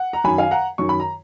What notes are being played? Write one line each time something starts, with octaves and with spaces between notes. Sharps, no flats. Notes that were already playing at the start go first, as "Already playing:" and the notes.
Already playing: F#5
A#5
F#2 D#3 G#5 B5
F5 G#5
F#5 A#5
F#2 D#3 C#6
B5
A#5